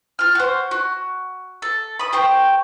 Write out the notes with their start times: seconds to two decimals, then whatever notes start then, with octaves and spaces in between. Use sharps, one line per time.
0.19 F4 F6
0.35 F#4 C5
0.71 F#4
1.62 A4
2.00 B5 D#6
2.13 G4 C5 G5 C#6